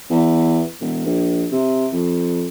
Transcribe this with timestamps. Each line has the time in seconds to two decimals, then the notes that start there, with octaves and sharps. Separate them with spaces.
0.10 E2
0.81 E1
1.06 A#1
1.52 C3
1.93 F2